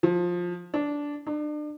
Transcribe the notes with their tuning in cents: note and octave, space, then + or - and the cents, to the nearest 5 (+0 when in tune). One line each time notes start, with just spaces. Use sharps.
F3 +15
D4 -10
D4 +35